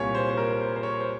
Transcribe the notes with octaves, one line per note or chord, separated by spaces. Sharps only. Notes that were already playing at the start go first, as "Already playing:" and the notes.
Already playing: C2 A#2 G3 A#3 C#5 G#5
C5
C5
A#4
C5
C5
C#5
C5